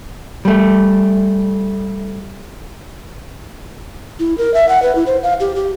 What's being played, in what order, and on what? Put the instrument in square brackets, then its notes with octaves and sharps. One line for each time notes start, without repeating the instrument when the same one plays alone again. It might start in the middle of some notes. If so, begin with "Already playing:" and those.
[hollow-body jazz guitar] G3 A3
[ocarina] E4
A#4
E5
F#5
B4
E4
C5
F5
G4
G4